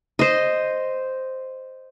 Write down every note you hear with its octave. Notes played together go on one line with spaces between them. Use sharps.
C5 D#5